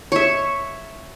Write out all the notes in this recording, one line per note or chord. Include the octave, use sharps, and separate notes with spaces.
C#5 E5